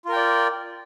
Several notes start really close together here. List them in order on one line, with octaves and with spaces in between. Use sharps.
F4 A#4 G5 D5